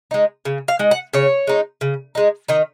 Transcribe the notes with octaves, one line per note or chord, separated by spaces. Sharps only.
G#3 D#4
C#3
F5
G#3 D#4
F#5
C#3 C#5
G#3 D#4
C#3
G#3 D#4
D#3 D#4